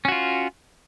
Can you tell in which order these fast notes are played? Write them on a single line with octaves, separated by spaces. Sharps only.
C#4 F#4 F4